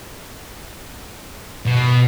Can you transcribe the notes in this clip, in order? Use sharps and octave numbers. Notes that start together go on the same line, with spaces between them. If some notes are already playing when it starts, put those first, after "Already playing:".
B2